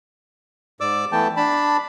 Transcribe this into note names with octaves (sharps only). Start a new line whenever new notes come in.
G#2 D5 D6 E6
E3 A3 B3 G5 A5
D4 A5 B5